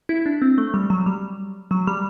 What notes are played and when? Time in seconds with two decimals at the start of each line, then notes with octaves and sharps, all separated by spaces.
0.09 E4
0.26 D4
0.42 C4
0.58 A3
0.74 G3
0.90 F#3
1.06 G3
1.71 F#3
1.87 G3